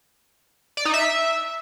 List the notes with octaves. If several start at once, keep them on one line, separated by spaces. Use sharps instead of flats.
D5
D#4
E5